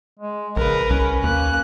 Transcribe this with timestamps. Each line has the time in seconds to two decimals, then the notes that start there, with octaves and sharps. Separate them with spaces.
0.19 G#3
0.57 A#1 C#3 A#4 B4
0.90 C2 C#4
1.24 D#2 A#3 F#6